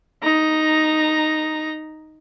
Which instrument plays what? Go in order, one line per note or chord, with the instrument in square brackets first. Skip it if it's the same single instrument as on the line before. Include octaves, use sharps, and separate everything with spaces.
[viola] D#4 A#5